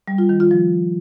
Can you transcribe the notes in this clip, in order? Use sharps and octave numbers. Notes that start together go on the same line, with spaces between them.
G3
F4
D#3
F4
F3